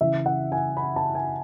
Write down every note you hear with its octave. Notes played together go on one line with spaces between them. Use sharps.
C#3 E3 E5
F#5
G#5
B5
A5
G#5